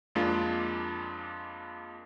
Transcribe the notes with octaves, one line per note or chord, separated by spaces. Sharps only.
F2 G#3 A#3 D4 F4